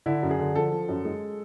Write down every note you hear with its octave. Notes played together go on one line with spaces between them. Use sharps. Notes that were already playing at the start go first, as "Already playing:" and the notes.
D3 E4
F#2
G#4
D3
F3 A4
F3
F#2
G#3